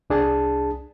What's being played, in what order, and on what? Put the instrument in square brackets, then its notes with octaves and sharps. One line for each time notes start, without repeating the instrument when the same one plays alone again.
[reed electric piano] C2 D4 G#4 A5